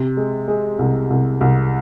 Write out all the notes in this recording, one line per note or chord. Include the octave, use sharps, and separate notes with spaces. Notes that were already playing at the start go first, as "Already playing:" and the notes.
Already playing: C3
G#3
G#3
C2
C2
C2